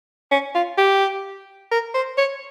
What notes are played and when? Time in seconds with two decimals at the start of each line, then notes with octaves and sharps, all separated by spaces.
0.32 C#4
0.55 F4
0.78 G4
1.71 A#4
1.94 C5
2.18 C#5